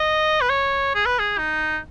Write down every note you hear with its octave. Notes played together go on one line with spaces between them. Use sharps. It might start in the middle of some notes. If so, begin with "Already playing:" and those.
Already playing: D#5
B4
C#5
G#4
B4
G#4
D#4